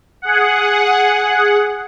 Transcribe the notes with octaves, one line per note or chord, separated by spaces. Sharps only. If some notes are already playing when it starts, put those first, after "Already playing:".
G#4 F#5